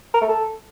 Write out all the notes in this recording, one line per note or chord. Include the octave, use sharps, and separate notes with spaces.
A#4
A3
A4